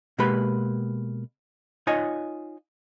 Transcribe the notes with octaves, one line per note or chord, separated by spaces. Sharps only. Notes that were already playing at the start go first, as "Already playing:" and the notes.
B2 G#3 A#3 G4 B4 B5
D#4 F4 C#5 D#5 G#5